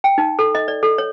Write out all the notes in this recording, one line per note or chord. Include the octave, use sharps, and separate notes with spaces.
G5
D#4
A4
D#5
D5
A4
C#5